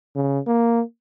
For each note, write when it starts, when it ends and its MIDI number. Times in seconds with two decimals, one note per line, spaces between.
0.16 0.40 49
0.47 0.81 58